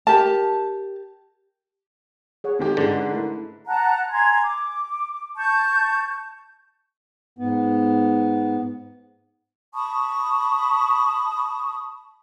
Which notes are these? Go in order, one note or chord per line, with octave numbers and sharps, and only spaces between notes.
G4 A#4 A5
G#4 C#5 F#5
D#3 G#3 C4 F#4 G4 A4
G#2 D3 G#3 C#4 B4
F#5
A3 E4 A#4
F#5 A5 A#5 F#6
G#5 A#5 C6 G#6
D6
A5 C#6 G6
G#2 B3
A5 B5 C#6 D#6